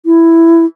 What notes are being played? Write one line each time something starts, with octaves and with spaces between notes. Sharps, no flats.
E4